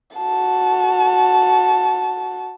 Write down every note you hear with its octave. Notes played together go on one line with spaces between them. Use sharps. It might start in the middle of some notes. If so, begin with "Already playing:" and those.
F#4 A5